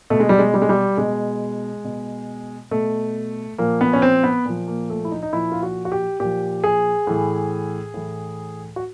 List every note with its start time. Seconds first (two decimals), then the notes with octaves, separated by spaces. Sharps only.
0.10 B2 A3
0.20 G#3
0.29 G3
0.39 G#3
0.54 G3
0.62 G#3
0.69 G3
0.97 B2 G#3
1.85 B2
2.71 B2 A3
3.58 A#2 F3 A#3
3.81 B3
3.93 C#4
4.02 C4
4.24 B3
4.45 A#2 F3
4.68 A#3
4.90 A3
5.05 E4
5.11 D#4
5.22 D#4
5.33 A#2 F3 E4
5.52 F4
5.63 F#4
5.85 F#4
5.92 G4
6.20 A#2 F3 G4
6.64 G#4
7.07 A2 E3
7.94 A2 E3
8.76 F#4